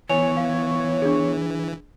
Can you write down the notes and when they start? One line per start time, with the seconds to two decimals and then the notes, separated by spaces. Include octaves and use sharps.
0.10 E3 B3 C#5 G#5 F7
0.37 F5
1.02 D4 G#4